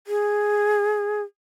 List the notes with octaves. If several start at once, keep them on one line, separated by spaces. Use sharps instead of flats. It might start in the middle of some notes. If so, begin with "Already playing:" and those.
G#4